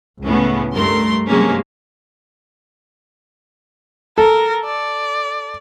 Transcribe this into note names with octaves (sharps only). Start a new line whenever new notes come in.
C#2 A2 C#3 B3 C#4
G2 A3 A#4 C6
G2 C3 F#3 G#3 A#3 C#4
A4 A#4
D5